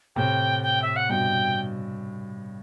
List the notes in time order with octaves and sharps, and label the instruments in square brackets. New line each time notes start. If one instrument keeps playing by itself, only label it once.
[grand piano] A2 C3 [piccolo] G5
[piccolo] G5
E5
F#5
[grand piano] G2 B2 [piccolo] G5